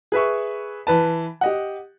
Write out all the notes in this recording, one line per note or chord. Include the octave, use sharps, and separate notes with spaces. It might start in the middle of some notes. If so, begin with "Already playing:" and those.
G#4 B4 E5 C#6
E3 B4 A5
G4 D#5 F#5